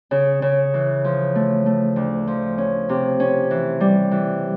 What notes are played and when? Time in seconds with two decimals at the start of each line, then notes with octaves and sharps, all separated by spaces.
0.11 C#3
0.42 C#3
0.74 E3
1.05 F3
1.35 A3
1.66 A3
1.96 D2
2.27 F3
2.58 C#4
2.89 C3
3.20 C#4
3.51 E3
3.80 G3
4.11 E3